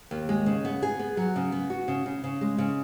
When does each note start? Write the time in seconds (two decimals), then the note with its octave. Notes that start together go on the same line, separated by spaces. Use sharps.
0.11 D#2
0.29 G#3
0.46 C#3
0.65 B3
0.83 G#4
0.99 B3
1.17 F#3
1.36 C#3
1.52 B3
1.70 F#4
1.88 C#3
2.06 C#3
2.24 C#3
2.41 G#3
2.58 C#3